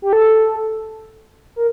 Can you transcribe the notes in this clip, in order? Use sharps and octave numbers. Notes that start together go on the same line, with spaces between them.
G4
A4
A#4